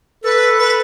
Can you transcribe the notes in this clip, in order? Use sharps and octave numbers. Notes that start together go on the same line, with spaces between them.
A4 B4
B4